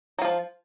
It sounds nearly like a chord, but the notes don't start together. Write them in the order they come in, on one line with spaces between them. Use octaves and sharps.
F#3 F4 F3